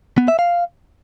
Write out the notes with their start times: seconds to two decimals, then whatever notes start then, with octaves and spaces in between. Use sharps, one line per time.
0.18 B3
0.28 E5
0.39 F5